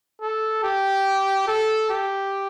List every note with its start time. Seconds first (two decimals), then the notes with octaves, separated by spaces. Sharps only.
0.21 A4
0.63 G4
1.48 A4
1.90 G4